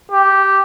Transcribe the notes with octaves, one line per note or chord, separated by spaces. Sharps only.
G4